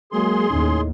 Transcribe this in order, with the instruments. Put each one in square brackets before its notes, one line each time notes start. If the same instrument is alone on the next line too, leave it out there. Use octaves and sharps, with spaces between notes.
[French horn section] F#3 G#3 A#3 [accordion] G#4 C6
[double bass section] D#2 [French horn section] A2 C#4 D#4